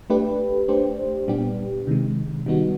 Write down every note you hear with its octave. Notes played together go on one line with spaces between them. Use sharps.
A3 D4 G4 B4
A3 D4 G4 C5
A#2 G3 B3 D4 G4
C3 D#3 G#3
D#3 G3 B3 D#4 F#4